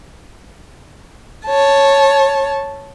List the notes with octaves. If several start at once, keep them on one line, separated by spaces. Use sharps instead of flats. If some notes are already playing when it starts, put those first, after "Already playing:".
C#5 A5